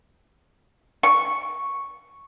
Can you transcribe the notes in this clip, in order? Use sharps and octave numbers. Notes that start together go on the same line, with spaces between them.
C#6